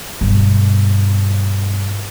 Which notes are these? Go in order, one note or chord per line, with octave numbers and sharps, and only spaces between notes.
G2 B2